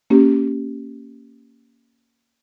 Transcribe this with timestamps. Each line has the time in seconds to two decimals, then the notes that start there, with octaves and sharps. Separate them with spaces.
0.10 A#3 C#4 G4